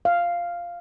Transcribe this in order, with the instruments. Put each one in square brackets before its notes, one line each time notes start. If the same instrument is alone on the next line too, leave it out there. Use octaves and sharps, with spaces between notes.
[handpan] F5